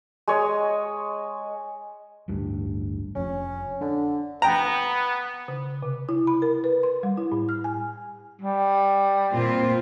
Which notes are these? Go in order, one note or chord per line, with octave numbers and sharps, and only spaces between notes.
G#3 C#5 D#5
A1 D2 G2
F1 C#4
D3 D4
B3 G5 A#5
C#3
C3
E4
B5
A#4
B4
C6
G3
E4
A2
F6
G#5
G3
A#2 C4 F4